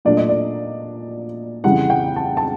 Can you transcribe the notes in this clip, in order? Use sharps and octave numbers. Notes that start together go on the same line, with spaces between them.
A#2 F#3 A3 D4 D5
D#5
D5
F2 C#3 E3 G3 F#5
G5
A5
A5